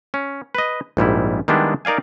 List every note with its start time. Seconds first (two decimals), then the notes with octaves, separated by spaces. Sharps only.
0.14 C#4
0.55 B4 D#5
0.97 A#1 G#2 G3 E4
1.48 D#3 G3 G#3 B3 D4 E4
1.85 D#4 A#4 D5 F5 G#5